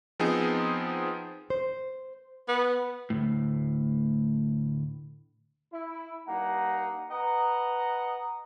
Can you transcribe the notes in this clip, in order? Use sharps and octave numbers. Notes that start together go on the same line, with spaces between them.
F3 B3 C4 D#4 G#4
C5
B3
D2 A2
E4
G2 A#3 D#4 F#5 A#5
B4 D#5 F#5 A#5